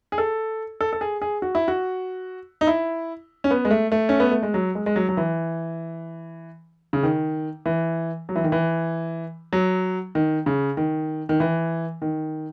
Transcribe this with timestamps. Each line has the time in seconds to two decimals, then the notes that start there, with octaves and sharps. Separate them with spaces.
0.12 G#4
0.18 A4
0.81 A4
0.93 A4
1.01 G#4
1.22 G#4
1.42 F#4
1.55 E4
1.68 F#4
2.61 D#4
2.67 E4
3.44 C#4
3.51 B3
3.65 G#3
3.71 A3
3.92 A3
4.09 C#4
4.20 B3
4.31 A3
4.43 G#3
4.54 F#3
4.75 G#3
4.86 G#3
4.96 F#3
5.09 F#3
5.17 E3
6.93 C#3
7.03 D#3
7.66 E3
8.29 F#3
8.36 E3
8.44 D#3
8.52 E3
9.53 F#3
10.15 D#3
10.46 C#3
10.77 D#3
11.29 D#3
11.40 E3
12.02 D#3